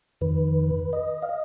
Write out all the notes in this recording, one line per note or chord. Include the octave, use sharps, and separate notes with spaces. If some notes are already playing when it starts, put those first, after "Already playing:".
F2 D#3 B4
D#5
F5
D#5